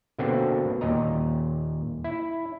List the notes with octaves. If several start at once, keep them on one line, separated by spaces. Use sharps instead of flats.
B2 D3 A#3 C4 D4 F#4
D#2 A#2 D#5 A#5
E4